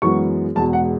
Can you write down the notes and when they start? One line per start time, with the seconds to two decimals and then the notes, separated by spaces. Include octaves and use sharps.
0.02 F#2 E3 G#3 B3 C#6
0.55 E1 E2 B2 G#3 A5
0.73 F#5